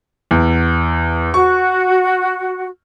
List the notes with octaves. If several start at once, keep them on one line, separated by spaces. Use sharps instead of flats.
E2
F#4 C#6